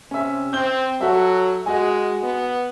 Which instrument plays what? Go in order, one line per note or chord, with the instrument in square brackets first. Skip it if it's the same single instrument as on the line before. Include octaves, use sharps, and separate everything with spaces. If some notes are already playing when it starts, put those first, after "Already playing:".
[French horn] C3 [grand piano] C#4 E5
[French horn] C4 [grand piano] G6 G7
[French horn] F#3 [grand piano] F#4 A4 E5
[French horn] G#3 [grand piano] F#4 D#5 G#5
[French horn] B3